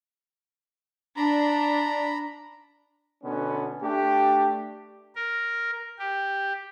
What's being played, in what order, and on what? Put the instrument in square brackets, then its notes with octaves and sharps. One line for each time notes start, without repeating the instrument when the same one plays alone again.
[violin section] D4 [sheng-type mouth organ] A#5 B5
[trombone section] B2 D3 B3 C#4
A3 D4 G4
[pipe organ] A#4
G4